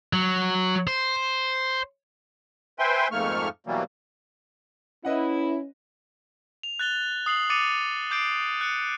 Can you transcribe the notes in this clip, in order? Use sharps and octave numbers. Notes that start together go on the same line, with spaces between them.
F#3
C5
B4 C5 E5 G5 G#5 C6
F2 G#2 A3 A#3 C#6 F6
B2 E3 F#3 G3 A#3
C#4 E4 B4 D#5 F#5
F7
F#6 A6 F7 G7
D#6 C7 F#7
D6 A6 C#7 D#7 F7
D6 G6 C7 D7
F#6 C#7